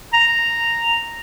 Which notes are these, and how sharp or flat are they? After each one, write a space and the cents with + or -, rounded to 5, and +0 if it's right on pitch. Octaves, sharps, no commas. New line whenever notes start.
A#5 -5